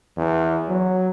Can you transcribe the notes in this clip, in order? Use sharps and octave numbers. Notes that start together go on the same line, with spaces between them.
E2
F#3